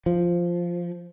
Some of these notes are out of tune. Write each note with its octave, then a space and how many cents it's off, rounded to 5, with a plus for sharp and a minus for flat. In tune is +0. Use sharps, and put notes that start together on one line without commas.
F3 -5